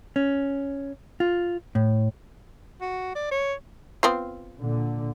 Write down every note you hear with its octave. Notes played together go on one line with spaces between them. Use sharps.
C#4
F4
A2
F#4
D5
C#5
B3 C4 F4
A#2 D3